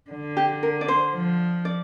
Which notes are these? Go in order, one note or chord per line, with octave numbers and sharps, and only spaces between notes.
D3
G4
A#4
D5
C5
F3
D5